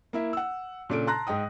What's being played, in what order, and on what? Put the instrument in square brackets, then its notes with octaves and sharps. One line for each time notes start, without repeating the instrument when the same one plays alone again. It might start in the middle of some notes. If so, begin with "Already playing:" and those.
[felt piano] A#3 E4 E5
F#5 E6
A#2 C#3 D4 A4 D7
A5 A#5 C6 F#6 A#6
G#2 D#5 G5 D#6